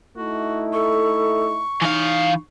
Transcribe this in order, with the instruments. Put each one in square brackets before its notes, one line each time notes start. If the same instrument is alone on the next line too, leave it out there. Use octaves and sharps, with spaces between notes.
[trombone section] A3 D#4 E4 [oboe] F#4
[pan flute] A4 [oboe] C#6
[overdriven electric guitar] E3 F5 [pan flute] D#4